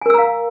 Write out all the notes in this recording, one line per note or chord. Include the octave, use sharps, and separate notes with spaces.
A#4 F5 G#5 A#5 E6